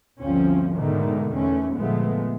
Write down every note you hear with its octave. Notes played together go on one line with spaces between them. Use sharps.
G1 D2 F3 C4 C#4
G#2 B2 D3 D#3 G#3 A3
E2 D3 A3 C#4
G1 A#2 F3 G#3 A3 B3